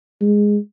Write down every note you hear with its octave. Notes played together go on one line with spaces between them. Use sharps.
G#3